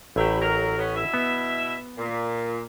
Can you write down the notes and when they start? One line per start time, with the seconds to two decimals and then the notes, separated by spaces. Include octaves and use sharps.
0.16 A1 F#3 A3 E4 G4
0.40 F#3 A#4
0.79 B3 C#4
0.96 B2 E4 E5
1.14 B3
1.97 A#2